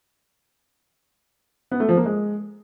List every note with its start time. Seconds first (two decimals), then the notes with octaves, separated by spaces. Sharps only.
1.72 B3
1.80 A3
1.89 F3
1.97 A#3
2.06 G#3